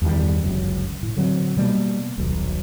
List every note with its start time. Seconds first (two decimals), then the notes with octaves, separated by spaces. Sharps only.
0.02 E2 G2 D#3 G3
0.44 G1 C#2 F#2
1.03 A2
1.17 D3 F#3 A#3 C4
1.57 B2 G3 G#3 A#3
2.18 D#1 B1